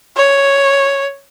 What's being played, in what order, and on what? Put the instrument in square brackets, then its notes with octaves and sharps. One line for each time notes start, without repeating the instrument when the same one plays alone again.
[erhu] C#5